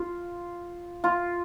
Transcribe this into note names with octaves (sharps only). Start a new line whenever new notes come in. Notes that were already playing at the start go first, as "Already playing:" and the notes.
Already playing: F4
F4